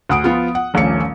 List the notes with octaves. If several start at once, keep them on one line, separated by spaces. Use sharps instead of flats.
D2 F#5 D#6 D7
F3 B3 F4
F#5
D#1 A#1 A3 C#4 C#7